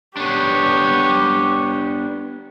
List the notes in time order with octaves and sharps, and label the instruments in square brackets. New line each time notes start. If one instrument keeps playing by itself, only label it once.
[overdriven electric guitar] B3 D4 [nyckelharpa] G4 C#5